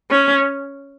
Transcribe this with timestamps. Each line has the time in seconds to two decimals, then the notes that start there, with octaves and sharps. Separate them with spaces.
0.11 C#4